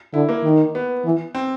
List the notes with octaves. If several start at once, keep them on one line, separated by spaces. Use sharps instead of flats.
D3 E4
A#3
D#3
B3
E3
C4